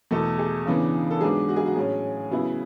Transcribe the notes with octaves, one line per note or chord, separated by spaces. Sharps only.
E2 B2 A3 E4 A4
G#4
C#3 E3 B3 D4
A4
G#2 F#3 B3 D4 G#4
F#4
G#4
F#4
A2 F#3 C#4 G#4
C#3 F#3 B3 E4